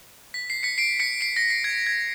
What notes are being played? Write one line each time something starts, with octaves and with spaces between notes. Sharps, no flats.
B6
C7
B6 C#7
C7 D7
B6 C#7
C7 D7
A#6
C7
G#6
G#6